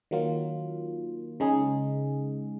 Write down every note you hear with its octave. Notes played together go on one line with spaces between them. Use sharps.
D#3 F#3 A#3 F4
C#3 G#3 D#4 G#4